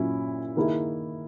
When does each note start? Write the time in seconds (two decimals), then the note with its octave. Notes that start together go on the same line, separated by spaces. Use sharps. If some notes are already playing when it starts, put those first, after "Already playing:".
Already playing: A#2 F#3 C#4 E4
0.57 D#3 A#3 E4 G#4